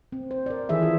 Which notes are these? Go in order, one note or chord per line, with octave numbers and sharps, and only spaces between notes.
C4
C5
A#4 D5
D#3 E3 G#4 A4 E5
F4